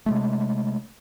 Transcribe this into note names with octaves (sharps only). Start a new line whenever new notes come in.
C3 G#3 A3